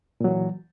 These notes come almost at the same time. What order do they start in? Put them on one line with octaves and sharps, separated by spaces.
A#2 F#3 E3